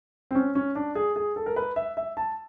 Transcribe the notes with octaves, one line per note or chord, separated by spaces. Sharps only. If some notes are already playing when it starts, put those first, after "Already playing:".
C4
C#4
C#4
D4
G#4
G#4
A4
A#4
B4
E5
E5
A5